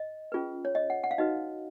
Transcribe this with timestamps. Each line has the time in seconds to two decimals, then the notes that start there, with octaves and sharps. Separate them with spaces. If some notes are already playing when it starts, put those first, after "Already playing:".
Already playing: D#5
0.32 C#4 F4 G#4 B4
0.65 C#5
0.75 D#5
0.90 F#5
1.04 F#5
1.11 F5
1.18 D#4 F#4 B4 D#5